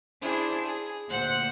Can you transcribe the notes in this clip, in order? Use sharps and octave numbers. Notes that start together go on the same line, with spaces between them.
D4 E4 G#4 C5
G#4
D2 A#2 C5 F#5 F#6